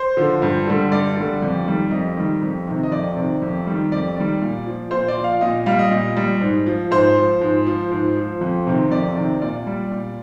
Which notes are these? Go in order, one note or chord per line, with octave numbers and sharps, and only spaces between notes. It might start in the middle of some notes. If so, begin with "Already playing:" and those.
Already playing: C5
D3 F3
G2
D3 G3
G2 D5
D3 G3
F2
D#3 G3
F2 D#5
D#3 G3
F2
C3 D#3
D#5
F2 D5
C3 D#3
F2
D#3 G3
F2 D5
D#3 G3
A#2
F3
A#2 C5
D5
F3
F5
A#2 D#5
G3 F5
D#5
A#2
G3
G#2
F3
G#2 C5
F3
G#2
F3
G#2
F3
F2
C3 D#3
F2 D5
C3 D#3
A#2 D5
G3
A#2